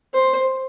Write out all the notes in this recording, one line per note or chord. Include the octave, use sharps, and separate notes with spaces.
C5